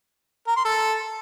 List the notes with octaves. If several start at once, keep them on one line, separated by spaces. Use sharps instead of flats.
A#4
C6
A4